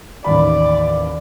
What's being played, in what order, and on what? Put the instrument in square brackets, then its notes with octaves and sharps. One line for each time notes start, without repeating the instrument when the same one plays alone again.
[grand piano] A1 D#2 B5 [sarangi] D5